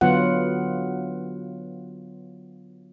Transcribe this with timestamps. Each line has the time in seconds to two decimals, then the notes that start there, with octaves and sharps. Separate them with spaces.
0.01 D3 F#3 B3 F4 F#5